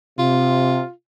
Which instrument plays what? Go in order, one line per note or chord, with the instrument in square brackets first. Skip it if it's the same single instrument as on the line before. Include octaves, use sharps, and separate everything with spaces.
[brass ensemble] C3 [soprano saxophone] F4